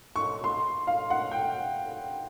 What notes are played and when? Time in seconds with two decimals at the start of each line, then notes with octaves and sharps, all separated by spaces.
0.16 C#6
0.44 C6
0.87 F5
1.10 F#5
1.31 G5